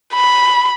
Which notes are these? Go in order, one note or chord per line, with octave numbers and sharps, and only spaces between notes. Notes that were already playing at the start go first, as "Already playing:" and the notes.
B5